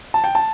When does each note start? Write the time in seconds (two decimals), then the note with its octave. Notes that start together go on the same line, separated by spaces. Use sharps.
0.14 A5
0.24 G5
0.35 A5